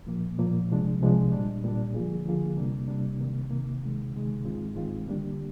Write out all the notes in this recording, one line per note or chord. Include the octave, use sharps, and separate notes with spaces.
A#2 F3 A#3
A#2 F3 A#3
C2 C3 F3 G#3 D4
C2 C3 F3 G#3 D4
A#2 G3 D4
A#2 G3 D4
D3 F3 A#3 F4 G#4
D3 F3 A#3 F4 G#4
C3 G3 A#3 D4
C3 G3 A#3 D4
C3 D#3 A#3
C3 D#3 A#3
D2 C3 D#3 G#3
D2 C3 D#3 G#3
G#2 D#3 G#3 C4 F4
G#2 D#3 G#3 C4 F4
D3 G3 A#3 D4 G4